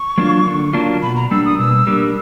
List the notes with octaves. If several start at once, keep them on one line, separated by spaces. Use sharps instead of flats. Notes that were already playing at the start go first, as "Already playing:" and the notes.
Already playing: C#6
F#3 A#3 D4 F4
D3
F#3 A#3 D4 F4
B2 B5
A#5
G3 A#3 D4 E6
D#6
B2 E6
G3 A#3 D4